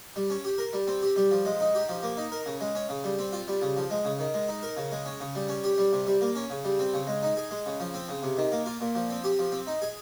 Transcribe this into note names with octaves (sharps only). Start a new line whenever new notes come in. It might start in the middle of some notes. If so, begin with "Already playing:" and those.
G3
C#4
G4
A#4
G3
C4
G4
G3
F3
G#3
D#4
G4
F3
A#3
D#4
A#4
C#3
G#3
C#4
C#3
G3
C4
F4
G3
C#3
F3
G#3
C#3
D#3
G#3
D#4
A#4
C#3
G#3
C#4
C#3
G3
C#4
G4
G3
C3
G3
A#3
C#4
C#3
G3
C4
C#3
G#3
D#4
G#4
G#3
C#3
F3
C4
C#3
C3
D#3
A#3
F4
A#2
F3
C4
G4
F3
C4
D#4
G#4